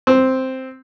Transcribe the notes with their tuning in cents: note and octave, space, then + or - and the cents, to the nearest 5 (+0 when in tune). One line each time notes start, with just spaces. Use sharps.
C4 +0